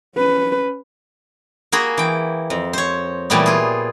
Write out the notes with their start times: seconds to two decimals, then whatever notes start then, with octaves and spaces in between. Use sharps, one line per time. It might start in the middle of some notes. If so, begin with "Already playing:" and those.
0.16 C#4 B4
1.72 A#3 F#4 G#4 B5
1.98 E3 G5
2.50 F2
2.73 C5 C#5
3.30 A#2 E3 G3 A3 B3
3.46 F4 G#4